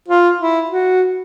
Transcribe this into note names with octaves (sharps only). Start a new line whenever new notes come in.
F4
E4
F#4